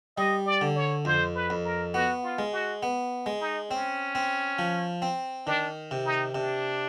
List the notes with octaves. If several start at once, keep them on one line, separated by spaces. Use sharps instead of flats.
G3 D#5
D5
D3
C#5
F2 C5
B4
F2
A#4
B3 F#4
F4
G#3
F#4
B3
G#3
D#4
C4 C#4
C4
F3
C4
D#3 D4
C3
D#4
C3 D4